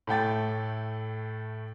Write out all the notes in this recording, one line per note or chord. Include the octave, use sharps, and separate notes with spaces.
A2 A3 G5 A6